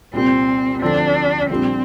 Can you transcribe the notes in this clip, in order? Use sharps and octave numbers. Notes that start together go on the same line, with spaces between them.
C2 A#2 G3 C4
D2 D3 F3 C4 D4
A#1 A#2 G3 C4 D4